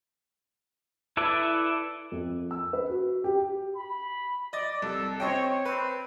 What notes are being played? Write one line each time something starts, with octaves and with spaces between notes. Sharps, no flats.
E4 A4 B4 D5 E5
F2
E6
B4
F#4
G4
B5
D5 D#5 A6
C2 A4
C4 C#5 D#5 G5
C4 B4